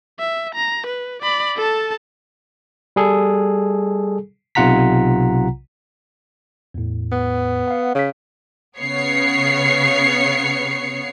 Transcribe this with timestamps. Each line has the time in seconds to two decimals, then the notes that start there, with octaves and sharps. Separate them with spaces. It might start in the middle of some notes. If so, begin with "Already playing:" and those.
0.19 E5
0.55 A#5
0.86 B4
1.22 D5 B5
1.56 A4 A5
2.96 G3 G#4 A4
4.55 B1 C3 F4 F#5 A#5 B6
6.74 E2 A2
7.12 B3
7.68 F5 F#5
7.95 C#3 C#5 B6
8.79 C#3 B3 C#5 C7 C#7